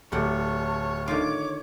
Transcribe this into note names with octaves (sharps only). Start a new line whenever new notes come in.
D1 A2 G3 C#5 F#5 A5
D3 D#3 F4 C#5 D6